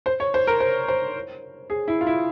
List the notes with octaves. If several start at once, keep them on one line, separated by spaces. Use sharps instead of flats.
C5
C#5
C5
A#4
C5
C5
G#4
E4
F4
E4